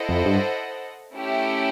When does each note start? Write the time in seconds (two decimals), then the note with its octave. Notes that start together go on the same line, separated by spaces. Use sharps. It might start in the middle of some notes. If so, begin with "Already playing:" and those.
Already playing: E4 A4 C5 D#5 F#5
0.09 F2
0.26 G2
1.15 A3 C#4 E4 G4